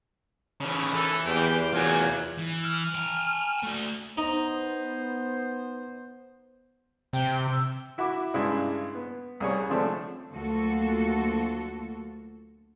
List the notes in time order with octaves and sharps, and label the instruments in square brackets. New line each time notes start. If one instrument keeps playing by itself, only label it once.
[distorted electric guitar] C#3 E3
[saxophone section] D#2 A4 [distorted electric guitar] E3
[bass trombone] E2 [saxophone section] C4 G4
[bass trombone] E2 [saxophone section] D#3 F#3 [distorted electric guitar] F4 G#5
[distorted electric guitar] E3
[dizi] F6
[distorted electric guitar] G5 G#5
A3 F#4
[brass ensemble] B3 C5 [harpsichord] D#4
[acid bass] C3 [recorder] G5
[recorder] E6
[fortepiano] E4 F#4 E5 B5 D6
G2 C#3 G#3 D4 E4
B3
C2 G3 G#4 C#5 C#6
D3 F3 G#3 A3 C4 D4
[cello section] D2 F#3 A#3 F4 F#4 A4